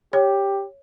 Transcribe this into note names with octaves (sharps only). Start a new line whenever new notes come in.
G4 C#5